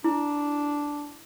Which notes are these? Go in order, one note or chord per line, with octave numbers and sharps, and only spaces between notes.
D4 E4